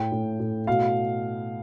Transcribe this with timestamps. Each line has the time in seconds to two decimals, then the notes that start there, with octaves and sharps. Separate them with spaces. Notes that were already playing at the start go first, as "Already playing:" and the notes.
Already playing: A2 G5
0.12 A2
0.40 A2
0.67 B2 F5